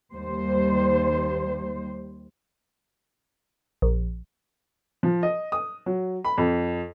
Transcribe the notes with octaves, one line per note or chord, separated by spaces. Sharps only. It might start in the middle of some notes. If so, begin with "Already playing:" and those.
D#2 G3 C5
A#1
F3
D#5
D#6
F#3
B5
F2